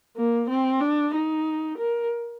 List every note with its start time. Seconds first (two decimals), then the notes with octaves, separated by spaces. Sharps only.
0.17 A#3
0.50 C4
0.81 D4
1.14 D#4
1.78 A#4